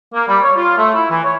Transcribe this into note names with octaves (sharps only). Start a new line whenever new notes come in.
A#3
G3
C#5
F4
A3
E4
E3
C#5